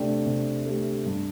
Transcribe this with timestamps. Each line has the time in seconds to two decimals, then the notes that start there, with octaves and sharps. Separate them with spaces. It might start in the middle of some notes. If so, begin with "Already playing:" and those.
Already playing: C3 A3 D4 G4
0.26 C3
0.66 A3 D4 G4
1.06 G2